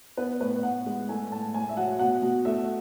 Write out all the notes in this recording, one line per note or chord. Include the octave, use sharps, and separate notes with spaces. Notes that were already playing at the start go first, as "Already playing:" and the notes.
B3 B4
A2 B4
A2 F#5
G#3
A3 G#5
A2 A5
A2 G#5
E5
F#3 F#5
B2 F#5
B2
A3 E5